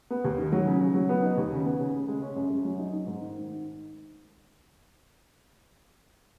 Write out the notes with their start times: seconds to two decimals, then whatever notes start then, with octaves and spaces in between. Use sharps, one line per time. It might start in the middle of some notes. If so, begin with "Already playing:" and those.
0.10 B3
0.24 D#2
0.38 D#3
0.52 F#3
0.66 C#3
0.81 C#3
0.94 F#3
1.09 B3
1.23 D#4
1.37 D#2
1.52 C#3
1.66 B3
1.79 C#3
1.94 C#3
2.08 G#3
2.22 C#4
2.36 F#2
2.50 F#2
2.65 F#3
2.79 D#4
2.93 D#4
3.06 G#2
3.22 D#3